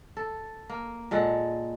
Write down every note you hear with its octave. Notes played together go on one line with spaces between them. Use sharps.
A4
A#3
A#2 G#3 A4 F#5